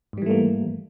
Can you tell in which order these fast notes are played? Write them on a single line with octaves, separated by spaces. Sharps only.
G#2 G3 E3 A3 A#3